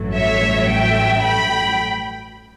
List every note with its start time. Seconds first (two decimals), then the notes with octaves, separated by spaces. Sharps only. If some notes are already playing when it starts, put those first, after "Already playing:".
Already playing: A1 G2 F#3 A3
0.15 C#5 E5
0.70 E5 G5
1.24 G5 B5